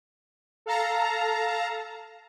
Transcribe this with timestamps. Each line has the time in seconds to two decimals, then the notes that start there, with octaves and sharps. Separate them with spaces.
0.66 A4 F5 A5 A#5